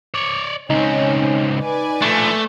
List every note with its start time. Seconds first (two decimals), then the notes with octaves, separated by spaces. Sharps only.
0.14 C#5 D5
0.70 C#2 C4 C#4 D#4
1.61 B4 D5 G#5
2.02 F3 A3 D4